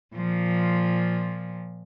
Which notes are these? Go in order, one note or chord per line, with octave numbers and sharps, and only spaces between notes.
A#2 F3